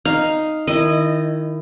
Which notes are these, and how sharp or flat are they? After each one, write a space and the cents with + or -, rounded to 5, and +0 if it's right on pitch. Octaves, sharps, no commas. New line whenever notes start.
D#4 +0 F5 +0
D#3 +0 E4 +15 D#5 -15